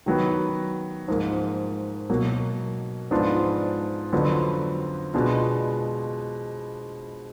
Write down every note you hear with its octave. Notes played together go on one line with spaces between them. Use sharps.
D#3 F#3 B3
G#2 F3 A#3
B2 F#3 A#3
G#2 F3 B3 D4 F4
F2 D3 F#3 B3 F4
B2 G#3 B3 D4 F4